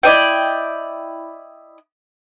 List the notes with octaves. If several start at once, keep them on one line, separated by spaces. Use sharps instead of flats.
E4 D5 D#5 G5